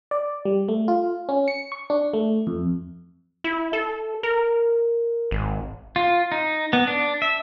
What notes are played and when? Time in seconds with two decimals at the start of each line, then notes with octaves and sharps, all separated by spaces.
0.11 D5
0.45 G3
0.68 A3
0.88 F4
1.29 C#4
1.48 C#7
1.72 C#6
1.90 D4
2.13 A3
2.47 F2
3.44 E4
3.73 A4
4.23 A#4
5.31 G#1
5.96 F4
6.32 D#4
6.73 B3
6.87 D4
7.22 E5